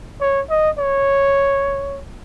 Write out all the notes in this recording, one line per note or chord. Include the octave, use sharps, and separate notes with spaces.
C#5
D#5
C#5